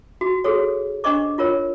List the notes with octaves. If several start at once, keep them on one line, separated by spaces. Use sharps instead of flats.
F#4
F#4 G#4 A4 C#5
D4 C5 D#5 C#6 D6
E4 F4 A#4 C#5